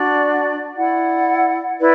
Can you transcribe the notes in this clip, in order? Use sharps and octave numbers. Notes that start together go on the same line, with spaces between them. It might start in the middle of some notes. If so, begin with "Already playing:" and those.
Already playing: D4 F#4 D5
E4 D5 F#5
E4 B4 D5